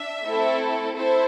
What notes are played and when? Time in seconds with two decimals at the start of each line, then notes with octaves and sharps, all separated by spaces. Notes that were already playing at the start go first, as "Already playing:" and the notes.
Already playing: D4 E5
0.25 A3 C4 E4 A4
0.97 E4 A4 C5